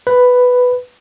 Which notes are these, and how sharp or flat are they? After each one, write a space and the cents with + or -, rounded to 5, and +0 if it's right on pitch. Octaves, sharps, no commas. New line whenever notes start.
B4 +5